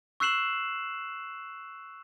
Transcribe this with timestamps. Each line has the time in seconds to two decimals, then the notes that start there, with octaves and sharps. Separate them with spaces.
0.20 C#6 E6 F#6 C7 E7 F#7